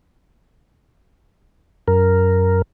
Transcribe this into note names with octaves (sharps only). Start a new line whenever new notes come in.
F#2 A#4